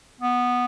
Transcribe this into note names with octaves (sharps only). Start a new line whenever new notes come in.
B3